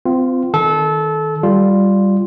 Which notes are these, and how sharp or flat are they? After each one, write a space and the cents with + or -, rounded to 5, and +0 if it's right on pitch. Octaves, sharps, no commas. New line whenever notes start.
C4 -30 F4 +0
D#3 +5 A4 -25
G3 +0 F4 +0